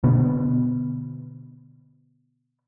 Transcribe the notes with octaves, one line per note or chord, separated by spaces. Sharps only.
B2 D3 B3